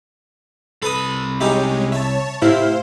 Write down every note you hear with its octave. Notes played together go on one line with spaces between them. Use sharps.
C2 A4 B4 B5 D#6
G#3 C#4 D#4 G4 E5
C#5 E5 A5
A2 C3 E4 C5 F5